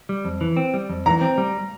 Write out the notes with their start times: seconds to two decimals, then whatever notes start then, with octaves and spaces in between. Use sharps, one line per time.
0.09 G3
0.25 F2
0.41 E3
0.57 C4
0.74 G3
0.89 F2
1.06 E3 A#5
1.21 C4
1.38 G3